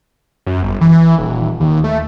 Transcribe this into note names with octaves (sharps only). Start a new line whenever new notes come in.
F#2
G1
E3
D#1
D#2
A3